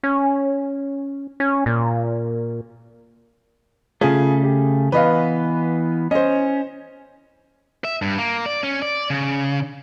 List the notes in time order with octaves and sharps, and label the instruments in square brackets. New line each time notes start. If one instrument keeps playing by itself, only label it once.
[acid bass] C#4
C#4
A#2
[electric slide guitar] C#3 A3 [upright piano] F4 G#4
[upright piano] G4
[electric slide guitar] E3 B3 [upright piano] B4 D#5 F5
[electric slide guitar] C#4 [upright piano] C5 D#5
[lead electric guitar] E5
G2
A#3
D5
C#4
D5
C#3